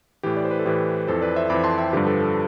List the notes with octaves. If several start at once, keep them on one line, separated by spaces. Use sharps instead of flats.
A2 E3 G4
D5
C5
B4
A4
A2 E3 G4
F2 E3 A4 C5
B4 D5
C5 E5
F2 E3 B5 D6
A5 C6
E5 G5
G2 D3 F3 G4 B4
A4
A4